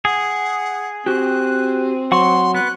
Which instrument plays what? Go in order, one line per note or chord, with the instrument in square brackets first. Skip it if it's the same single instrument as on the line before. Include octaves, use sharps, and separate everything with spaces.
[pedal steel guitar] G#4 [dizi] F#5
[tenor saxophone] C4 [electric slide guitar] F#4 G4 [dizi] F#6
[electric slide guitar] F#3 [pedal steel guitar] F#5 C#6 [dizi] C6
[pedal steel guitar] B3 [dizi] F#6